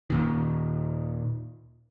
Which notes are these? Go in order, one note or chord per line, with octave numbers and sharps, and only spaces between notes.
D#2 A#2 D#3